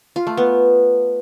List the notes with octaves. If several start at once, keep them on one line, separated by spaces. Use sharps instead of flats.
F4
A3
B3